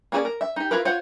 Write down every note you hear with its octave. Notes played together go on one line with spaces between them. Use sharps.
A#3 C#4 G#4 A#4 D5
A#4
E5
D#4 G4
E4 F4 A#4 B4
F4 C5 C#5 F#5